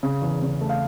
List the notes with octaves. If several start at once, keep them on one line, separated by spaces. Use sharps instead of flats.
C#3
E2
C#3
A3
F5